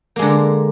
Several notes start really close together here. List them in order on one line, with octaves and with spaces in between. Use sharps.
A#3 G#3 D3